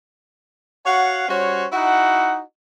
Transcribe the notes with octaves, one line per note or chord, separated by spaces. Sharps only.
F#4 C#5 F5 F#5
G3 C#4 F#4 C5 C#5
D#4 E4 F#4 F#5